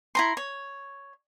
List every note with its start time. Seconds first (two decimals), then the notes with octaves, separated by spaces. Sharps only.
0.15 E4 A#5 C6
0.37 C#5